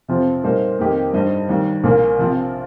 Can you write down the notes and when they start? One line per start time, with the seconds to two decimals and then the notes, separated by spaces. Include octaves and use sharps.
0.08 F2 C3 F3 C4 F4
0.44 A#2 G3 A#3 D#4 C5
0.79 F2 D#3 A#3 G4 D#5
1.14 G2 G3 D#4 C5 D#5
1.49 D#2 D#3 G3
1.83 A#1 A#2 A#3
2.18 C3 F3 C4 F4